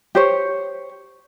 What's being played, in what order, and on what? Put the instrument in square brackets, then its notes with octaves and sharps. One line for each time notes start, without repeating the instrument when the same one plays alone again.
[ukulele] G4 C5 C#5